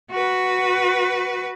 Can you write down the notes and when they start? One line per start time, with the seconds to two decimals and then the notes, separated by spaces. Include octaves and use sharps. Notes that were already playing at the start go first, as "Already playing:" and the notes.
0.11 F#4 B4